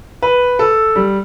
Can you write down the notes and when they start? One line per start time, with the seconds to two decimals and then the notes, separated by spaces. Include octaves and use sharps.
0.22 B4
0.59 A4
0.96 G3